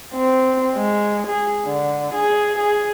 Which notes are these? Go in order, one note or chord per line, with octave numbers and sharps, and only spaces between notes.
C4
G#3
G#4
D3
G#4
G#4